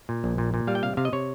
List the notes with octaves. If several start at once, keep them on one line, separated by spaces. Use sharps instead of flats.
A#2
A#1
A#2
A#2
G3 F5
G5
C3 F5
C3 F5
D#5
C3 C#5